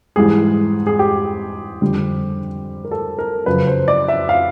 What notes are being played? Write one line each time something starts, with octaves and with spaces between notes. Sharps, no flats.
G#2 E3 G3 G#4
G#4
G4
F2 D3 G3
A#4
A4
A#4
F#2 C#3 F3 B4
C5
D5
E5
F5